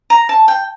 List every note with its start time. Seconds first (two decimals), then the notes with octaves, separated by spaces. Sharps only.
0.10 A#5
0.29 A5
0.48 G5